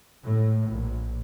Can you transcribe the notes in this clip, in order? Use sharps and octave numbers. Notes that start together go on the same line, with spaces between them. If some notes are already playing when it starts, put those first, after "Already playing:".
A2
A#1